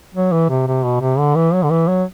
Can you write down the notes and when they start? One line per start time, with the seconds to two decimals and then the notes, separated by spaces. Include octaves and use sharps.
0.14 F#3
0.32 E3
0.49 C3
0.67 C3
0.83 B2
1.00 C3
1.18 D3
1.35 E3
1.53 F#3
1.63 D3
1.70 E3
1.88 F#3